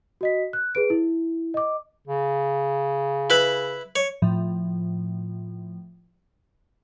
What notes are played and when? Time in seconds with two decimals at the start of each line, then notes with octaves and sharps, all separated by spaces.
0.21 F#4 D#5 B6
0.53 F#6
0.75 G#4 B4 D7
0.90 E4
1.54 D#5 D6
2.08 C#3
3.30 E4 B4 B5
3.96 C#5
4.22 A2 F3